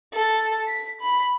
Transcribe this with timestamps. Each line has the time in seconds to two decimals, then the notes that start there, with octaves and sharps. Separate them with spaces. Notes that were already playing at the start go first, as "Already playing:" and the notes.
0.14 A4
0.68 B6
1.01 B5